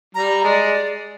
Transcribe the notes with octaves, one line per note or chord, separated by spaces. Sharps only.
G3 A#5
G#3 D5